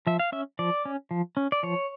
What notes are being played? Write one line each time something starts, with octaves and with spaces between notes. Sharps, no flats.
F3 E5
F5
C#4 E5
F3 D5
C#4
F3
C#4
D5
F3 C#5